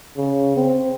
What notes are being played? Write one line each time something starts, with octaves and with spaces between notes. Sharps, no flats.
C#3
C4